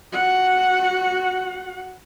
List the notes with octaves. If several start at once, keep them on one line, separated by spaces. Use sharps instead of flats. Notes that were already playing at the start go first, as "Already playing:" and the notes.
F#4 F#5